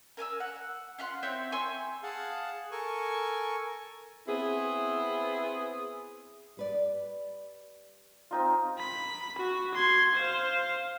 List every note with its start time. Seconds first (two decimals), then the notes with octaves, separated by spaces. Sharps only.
0.17 A#4 G#5 D6 E6
0.40 F#5
0.98 F4 E5 F#5 C6
1.23 C4 E4 C#5 G5
1.52 G#5 C6 C#6 E6
2.03 G#4 F5 F#5 A5
2.71 A4 A#4 G#5 C#6
4.27 B3 C4 E4 G#4
6.57 G3 B4 D5
8.31 C4 D#4 F4
8.79 B5
9.38 F#4
9.74 C6 G#6
10.15 C5 F5